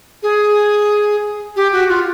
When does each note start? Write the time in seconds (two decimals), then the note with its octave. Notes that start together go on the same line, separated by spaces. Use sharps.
0.23 G#4
1.56 G4
1.72 F#4
1.89 F4